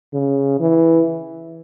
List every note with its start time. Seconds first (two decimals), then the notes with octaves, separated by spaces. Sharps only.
0.13 C#3
0.60 E3